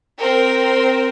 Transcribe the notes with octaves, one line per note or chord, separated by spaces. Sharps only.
C4 A#4